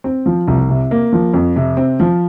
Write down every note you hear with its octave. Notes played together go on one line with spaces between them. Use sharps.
C4
F3
C2
C3
A#3
F3
F2
C3
C4
F3